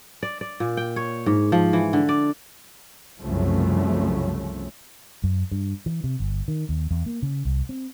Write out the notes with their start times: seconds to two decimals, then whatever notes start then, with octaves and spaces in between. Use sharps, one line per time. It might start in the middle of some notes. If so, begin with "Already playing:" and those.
0.23 D5
0.41 D5
0.60 A#2
0.77 G5
0.96 C#5
1.26 G#2
1.52 F3
1.73 E3
1.93 D3
2.09 D5
3.20 C2 F#2 C#3 F3 A3
5.24 F#2
5.51 G2
5.86 E3
6.04 C3
6.20 G1
6.48 D#3
6.69 D#2
6.91 E2
7.06 A#3
7.22 C#3
7.45 C2
7.69 C4